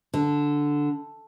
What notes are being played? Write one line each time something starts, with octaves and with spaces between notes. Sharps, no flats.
D3